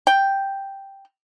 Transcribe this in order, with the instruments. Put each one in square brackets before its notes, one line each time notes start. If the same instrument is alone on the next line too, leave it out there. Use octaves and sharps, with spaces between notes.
[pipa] G5